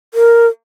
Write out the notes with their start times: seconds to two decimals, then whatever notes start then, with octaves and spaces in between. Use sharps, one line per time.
0.14 A#4